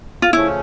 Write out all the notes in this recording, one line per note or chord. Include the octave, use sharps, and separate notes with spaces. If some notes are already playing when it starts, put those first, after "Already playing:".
F4
C#3 F3 A3 C#4 E4